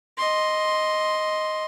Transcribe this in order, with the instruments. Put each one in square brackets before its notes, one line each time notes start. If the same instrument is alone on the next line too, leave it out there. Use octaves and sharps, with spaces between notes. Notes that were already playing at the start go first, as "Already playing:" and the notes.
[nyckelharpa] D#5 C6